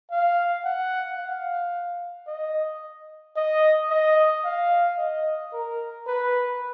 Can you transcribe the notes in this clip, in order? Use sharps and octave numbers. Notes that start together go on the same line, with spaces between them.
F5
F#5
F5
D#5
D#5
D#5
F5
D#5
A#4
B4